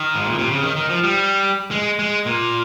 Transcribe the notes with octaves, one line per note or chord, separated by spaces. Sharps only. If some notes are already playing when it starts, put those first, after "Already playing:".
Already playing: D#3
G#2
A#2
C3
C#3
D#3
D#3
F3
G3
G#3
G#3
A#2